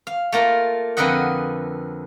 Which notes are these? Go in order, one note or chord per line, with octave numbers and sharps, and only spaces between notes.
F5
A3 A#3 F4 A#4
F2 D3 A#4 B4 D#5 F#5